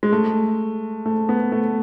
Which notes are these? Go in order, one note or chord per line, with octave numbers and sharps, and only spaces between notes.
G#3
A3
A3
B3
A3